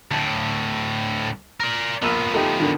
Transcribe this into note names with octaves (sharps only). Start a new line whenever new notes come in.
D2 A2 A5
A#4 D5
A#1 F3 A#3 B3 E6
A3 D#4 G4
D3 D#3